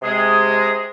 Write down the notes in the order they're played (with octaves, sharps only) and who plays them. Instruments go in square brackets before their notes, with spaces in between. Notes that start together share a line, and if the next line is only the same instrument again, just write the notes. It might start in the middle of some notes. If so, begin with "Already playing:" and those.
[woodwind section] C3 G#3 G#4